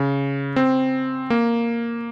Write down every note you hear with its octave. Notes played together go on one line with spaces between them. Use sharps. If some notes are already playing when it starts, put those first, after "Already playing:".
Already playing: C#3
C4
A#3